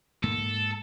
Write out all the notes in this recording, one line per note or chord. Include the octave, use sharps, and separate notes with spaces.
G#2 A#3 A4